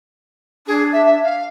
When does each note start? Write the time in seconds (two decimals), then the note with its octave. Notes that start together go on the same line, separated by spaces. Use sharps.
0.67 D4 G#4
0.92 E5
1.06 E5
1.23 F5